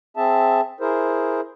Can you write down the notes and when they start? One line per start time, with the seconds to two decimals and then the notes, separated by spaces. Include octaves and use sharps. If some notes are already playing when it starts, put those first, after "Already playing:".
0.17 C4 G#4 E5 A5
0.80 E4 G#4 A#4 C5